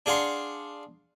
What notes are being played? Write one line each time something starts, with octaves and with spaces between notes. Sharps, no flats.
D4 G#4 F5 F#5 C6